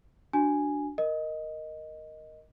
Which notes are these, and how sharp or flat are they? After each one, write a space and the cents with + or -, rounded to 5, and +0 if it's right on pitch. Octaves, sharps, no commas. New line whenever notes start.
D4 +0 F#4 +0 G#5 +0
A#4 +0 D#5 +0